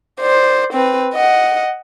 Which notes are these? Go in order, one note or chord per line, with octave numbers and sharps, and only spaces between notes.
C5 D5
C4 B4
D#5 F#5